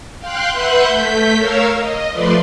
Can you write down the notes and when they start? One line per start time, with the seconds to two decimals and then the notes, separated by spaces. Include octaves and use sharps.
0.19 F5 G5 C6 F#6
0.51 B4 E5 F#5 C6 F#6 G6
0.87 A3 G6 B6
1.35 A#4 C#5 F5 E6 F6
1.76 D#5
2.10 F3 A3 B4 D5 C6